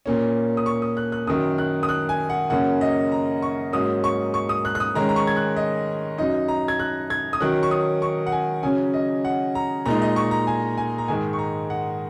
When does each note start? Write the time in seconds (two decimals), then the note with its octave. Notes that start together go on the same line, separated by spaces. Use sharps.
0.06 A#2 A#3 C#4
0.57 D#6
0.66 C#6
0.82 D#6
0.97 F#6
1.12 F#6
1.27 F#2 D#3 F#3 D#6
1.58 F#6
1.83 D#6
1.89 F#6
2.09 G#5
2.30 F#5
2.50 F#2 C#3 A#3 C#4 F#5
2.81 D#5
3.12 A#5
3.42 C#6
3.73 G#2 F#3 A#3 C#4 D#6
4.04 C#6
4.34 C#6
4.49 D#6
4.65 F#6
4.75 F#6
4.80 D#6
4.95 D#3 G#3 C#4 A#5
5.09 A#5
5.16 C#6
5.27 G#6
5.37 F#6
5.56 D#5
6.18 F#2 F#3 D#4 D#5
6.48 A#5
6.68 G#6
6.79 F#6
7.10 G#6
7.33 D#6
7.40 D#3 F#3 C#4 F#6
7.63 C#6
7.71 D#6
8.02 C#6
8.26 F#5
8.32 G#5
8.63 C#3 F#3 C#4 G#5
8.94 D#5
9.25 F#5
9.55 A#5
9.85 A#2 G#3 D#4 A#5
10.02 D#5
10.16 C#6
10.31 A#5
10.47 G#5
10.78 G#5
10.98 A#5
11.08 G#2 D#3 G#3 D#4 G#5
11.33 C#6
11.39 A#5
11.70 F#5